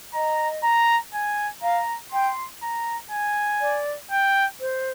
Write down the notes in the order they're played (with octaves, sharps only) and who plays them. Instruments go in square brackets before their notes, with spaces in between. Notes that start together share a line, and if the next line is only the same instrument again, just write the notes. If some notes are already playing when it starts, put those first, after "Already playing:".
[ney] D#5 [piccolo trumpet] A#5
[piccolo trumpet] A#5
G#5
[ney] F5 [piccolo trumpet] A#5
[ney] G5 [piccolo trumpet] C6
[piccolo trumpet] A#5
G#5
[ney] D5
[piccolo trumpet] G5
[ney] C5